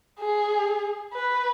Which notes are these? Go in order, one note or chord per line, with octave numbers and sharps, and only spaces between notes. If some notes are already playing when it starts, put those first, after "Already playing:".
G#4
B4